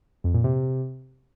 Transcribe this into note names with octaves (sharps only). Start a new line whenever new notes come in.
F2
A#2
C3